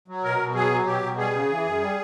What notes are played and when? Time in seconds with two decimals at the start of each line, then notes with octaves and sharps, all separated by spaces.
0.08 F#3
0.24 B2 A#4
0.39 B2
0.55 F#3 G#4
0.71 F#3
0.86 B2 G4
1.02 B2
1.18 G3 G#4
1.33 C#3
1.49 E3
1.65 F#2
1.81 G3